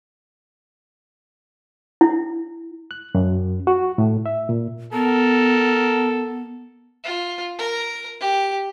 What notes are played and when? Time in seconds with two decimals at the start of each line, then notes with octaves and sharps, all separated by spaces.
2.01 E4
2.91 F#6
3.15 F#2
3.67 F#4
3.98 A2
4.26 E5
4.49 A#2
4.93 B3 A4 A#4
7.04 F4
7.58 A#4
8.21 G4